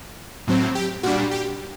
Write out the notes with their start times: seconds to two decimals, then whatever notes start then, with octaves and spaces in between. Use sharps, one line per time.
0.47 A2 F#3 C4
0.75 G4
1.03 A#2 G3 D4 F#4
1.31 G4